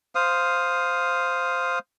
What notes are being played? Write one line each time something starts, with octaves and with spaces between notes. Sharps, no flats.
C5 F5 D#6